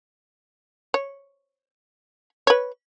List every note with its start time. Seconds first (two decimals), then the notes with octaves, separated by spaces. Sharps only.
0.94 C#5
2.47 B4 C#5